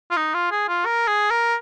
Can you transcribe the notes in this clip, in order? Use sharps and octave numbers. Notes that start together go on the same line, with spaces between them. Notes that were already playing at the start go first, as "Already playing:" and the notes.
F4
D#4
F4
G#4
F4
A#4
G#4
A#4